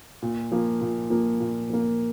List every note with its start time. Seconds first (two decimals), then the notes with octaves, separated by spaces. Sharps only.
0.22 A#2
0.52 F3 A#3
0.81 A#2
1.10 F3 A#3
1.40 A#2
1.70 F3 A#3